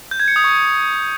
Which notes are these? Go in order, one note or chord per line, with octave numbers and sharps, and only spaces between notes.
G6
G#6
C#7
D#6
C#6